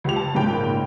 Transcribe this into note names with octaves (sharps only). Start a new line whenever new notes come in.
C#2 G4 F7
A5
A#1 G#2 C#3 A#3 G5 B5